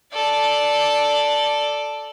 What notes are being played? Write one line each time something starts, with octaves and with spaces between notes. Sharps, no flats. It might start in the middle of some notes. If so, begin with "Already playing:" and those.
A4 D5